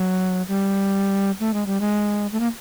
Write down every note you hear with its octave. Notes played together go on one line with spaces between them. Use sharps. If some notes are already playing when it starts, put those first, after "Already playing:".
Already playing: F#3
G3
A3
G#3
G3
G#3
A3
A#3